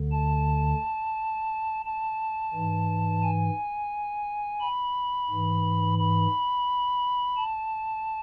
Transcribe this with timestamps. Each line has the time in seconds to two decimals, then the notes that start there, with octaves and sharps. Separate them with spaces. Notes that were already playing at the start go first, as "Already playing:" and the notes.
Already playing: D2 D3
0.11 A5
1.85 A5
2.53 G#2 E3
3.23 G#5
4.61 B5
5.30 G#2 E3
5.99 B5
7.36 A5